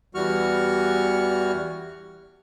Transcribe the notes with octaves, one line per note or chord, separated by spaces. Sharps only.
E2 E3 G3 F#4 C#6 F6